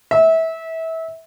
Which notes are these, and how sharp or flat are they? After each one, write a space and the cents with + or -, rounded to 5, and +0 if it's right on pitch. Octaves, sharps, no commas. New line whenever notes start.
E5 -25